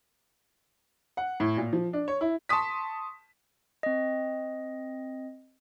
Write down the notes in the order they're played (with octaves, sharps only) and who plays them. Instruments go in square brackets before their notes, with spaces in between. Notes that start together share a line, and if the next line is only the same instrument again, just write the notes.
[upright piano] F#5
A2
A#2
F3
D4
C#5
E4
A5 C6 C#6 D#6 B6
[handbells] C4 D#5